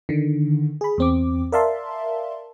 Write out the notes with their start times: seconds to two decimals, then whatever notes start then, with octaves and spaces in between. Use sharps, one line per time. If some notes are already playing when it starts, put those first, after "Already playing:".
0.09 D3 D#3
0.81 G#4 B5
0.98 E2 C4 D6
1.52 A#4 D5 E5 F5 A5 C6